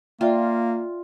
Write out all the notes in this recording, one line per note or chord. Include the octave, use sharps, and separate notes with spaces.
A#3 F4 D5 E5 G5